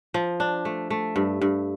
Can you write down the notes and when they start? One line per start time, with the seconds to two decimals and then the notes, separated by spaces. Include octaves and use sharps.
0.14 F3
0.40 D4
0.65 A3
0.90 A3
1.16 G2
1.42 G2